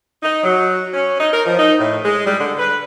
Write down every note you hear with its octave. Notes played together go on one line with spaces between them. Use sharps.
D#4
F#3
C#4
D#4
A#4
F3
D#4
A2
G#3
G3
D3
B4